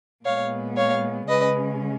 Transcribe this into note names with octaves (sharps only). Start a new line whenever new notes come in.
A#2 G#3 B3 C#5 F5
C#5 F5
C#3 G#3 C#4 B4 D#5